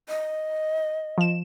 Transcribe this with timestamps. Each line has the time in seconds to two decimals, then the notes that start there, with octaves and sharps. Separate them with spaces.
0.09 D#5
1.18 F3 E7